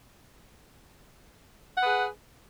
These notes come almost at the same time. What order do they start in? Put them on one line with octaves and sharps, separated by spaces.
F#5 B4 G#4